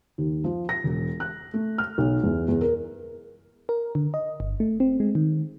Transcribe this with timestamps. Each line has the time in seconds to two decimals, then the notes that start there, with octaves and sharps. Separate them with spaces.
0.18 D#2
0.44 F3
0.69 A#6
0.84 E1
1.20 F#6
1.54 A3
1.78 F6
1.98 B1
2.24 E2
2.48 E2
2.61 A#4
3.69 A#4
3.95 D3
4.14 D#5
4.40 G1
4.60 A3
4.80 C4
5.00 G#3
5.15 D#3